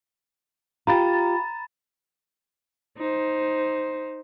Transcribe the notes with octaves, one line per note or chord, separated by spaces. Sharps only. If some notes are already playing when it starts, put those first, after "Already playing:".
F4 G4 A#5 B5 A6
D#4 C5